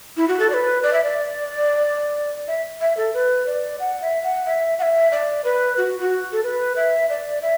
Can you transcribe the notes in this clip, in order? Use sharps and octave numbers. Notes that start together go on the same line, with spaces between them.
E4
F#4
A4
D5
B4
D5
E5
D5
E5
E5
A4
B4
D5
F#5
E5
F#5
E5
F#5
E5
D5
B4
F#4
F#4
A4
B4
E5
D5
E5